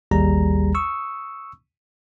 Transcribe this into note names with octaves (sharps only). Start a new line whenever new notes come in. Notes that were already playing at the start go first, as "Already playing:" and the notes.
A1 D#2 G3 G#4 A#5
C#6 D#6 E6